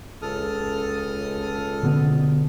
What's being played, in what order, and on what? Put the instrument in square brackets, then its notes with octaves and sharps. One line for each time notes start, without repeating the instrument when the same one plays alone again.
[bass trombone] C#2 [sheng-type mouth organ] A4 D#6 F6
[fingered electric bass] B2 D3 B3